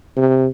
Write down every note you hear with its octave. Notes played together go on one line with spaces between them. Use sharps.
C3